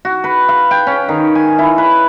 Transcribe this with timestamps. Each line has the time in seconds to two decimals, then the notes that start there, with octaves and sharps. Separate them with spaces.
0.05 F#4
0.24 B4
0.49 F5
0.71 G5
0.87 C#4
1.09 D#3
1.35 G#5
1.59 E4
1.78 B4